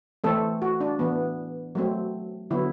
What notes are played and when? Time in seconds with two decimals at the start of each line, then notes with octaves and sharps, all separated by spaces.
0.24 E3 A3 C4 A4
0.62 F#4
0.80 D4
0.99 E3 B3
1.75 F#3 A3 C4
2.51 D3 F#3 B3 E4